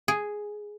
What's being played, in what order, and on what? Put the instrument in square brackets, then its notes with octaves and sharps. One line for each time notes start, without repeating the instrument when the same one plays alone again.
[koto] G#4